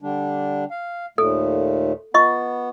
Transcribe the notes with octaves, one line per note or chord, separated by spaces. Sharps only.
D3 G3 D4
F5
D#2 A#2 A3 A4
B3 F4 D#5 C#6